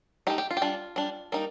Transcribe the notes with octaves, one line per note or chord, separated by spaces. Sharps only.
A3 D#4 G4
G4
F4
G4
G3 D4 F4
G3 D4
G3 A#3 D#4